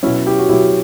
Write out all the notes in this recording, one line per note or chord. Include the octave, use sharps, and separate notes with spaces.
B2 F#3 C#4 E4
E4 G4
F#4
B2 F#3 E4 G4